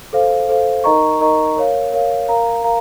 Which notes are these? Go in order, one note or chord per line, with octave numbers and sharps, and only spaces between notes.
A4 C5 F5
A4 C5 F5
D#4 A#4 D#5 A#5 C#6
D#4 A#4 D#5 A#5 C#6
A#4 C#5 F5
A#4 C#5 F5
A#4 F5 A#5
A#4 F5 A#5